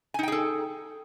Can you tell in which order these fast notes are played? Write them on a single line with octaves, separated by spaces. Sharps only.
G#5 D#4 G5 G#4 A4